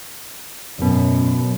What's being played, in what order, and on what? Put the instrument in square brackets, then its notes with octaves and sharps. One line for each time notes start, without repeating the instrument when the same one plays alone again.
[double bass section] F#2 [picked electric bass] B2